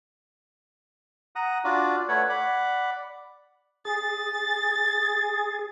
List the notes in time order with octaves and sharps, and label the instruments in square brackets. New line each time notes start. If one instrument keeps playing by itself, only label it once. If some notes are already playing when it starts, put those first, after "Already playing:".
[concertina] F#5 A#5 D#6
D4 F4 F#4 D5
A3 B4 C#5 F#5
D5 F#5 B5
[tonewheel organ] G#4 [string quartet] A6